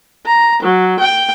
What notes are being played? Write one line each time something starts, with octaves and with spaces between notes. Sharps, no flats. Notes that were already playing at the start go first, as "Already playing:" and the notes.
A#5
F#3
G5